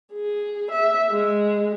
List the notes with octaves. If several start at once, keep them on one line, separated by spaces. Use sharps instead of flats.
G#4
E5
G#3